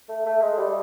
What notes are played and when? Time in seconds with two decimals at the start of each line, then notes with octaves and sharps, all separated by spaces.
0.09 A3
0.26 A3
0.42 G#3
0.58 G3